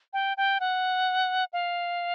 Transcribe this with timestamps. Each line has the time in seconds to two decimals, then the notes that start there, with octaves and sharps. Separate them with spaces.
0.13 G5
0.37 G5
0.60 F#5
1.53 F5